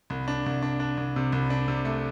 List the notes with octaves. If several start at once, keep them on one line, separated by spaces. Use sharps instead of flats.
C2
D4
C2
D4
D4
C2
C3
C2
D4
C3
A3